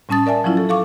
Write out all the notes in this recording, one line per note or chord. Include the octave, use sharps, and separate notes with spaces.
A2 G3 C#4 A5 D#6 A6
A#4 D5 E5 G#5 A5
F3 F#3 C#4 E4 F4
A4
A4 F5 C#6 D6